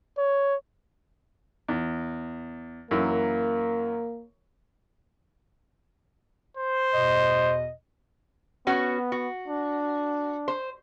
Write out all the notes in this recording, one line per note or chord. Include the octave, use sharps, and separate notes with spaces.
C#5
E2
F#2 E3 A#3
C5
E2 B2 D#5
B3 C#4 F#4
F#4
D4
C5